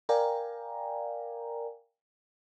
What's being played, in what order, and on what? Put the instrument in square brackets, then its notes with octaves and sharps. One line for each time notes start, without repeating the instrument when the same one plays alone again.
[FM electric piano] A#4 D5 F5 G5 G#5 A#5